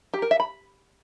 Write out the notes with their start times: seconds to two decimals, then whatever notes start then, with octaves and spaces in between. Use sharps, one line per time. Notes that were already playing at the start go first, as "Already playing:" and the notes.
0.14 G4
0.22 A#4
0.31 E5
0.40 B5